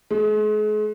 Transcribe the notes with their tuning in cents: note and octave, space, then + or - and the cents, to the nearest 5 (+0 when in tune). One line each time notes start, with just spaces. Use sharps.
G#3 +40